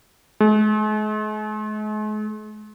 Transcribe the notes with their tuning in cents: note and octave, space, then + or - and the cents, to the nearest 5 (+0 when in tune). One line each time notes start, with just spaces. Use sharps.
G#3 +45